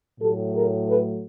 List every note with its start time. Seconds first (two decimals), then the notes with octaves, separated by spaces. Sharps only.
0.20 A2 F#3 A3 G4 A4
0.53 G#4 A#4
0.86 A4 B4